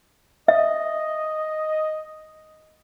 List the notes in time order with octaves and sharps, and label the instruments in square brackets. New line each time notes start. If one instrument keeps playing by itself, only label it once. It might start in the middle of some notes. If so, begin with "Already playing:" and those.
[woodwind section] D#5 [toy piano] E5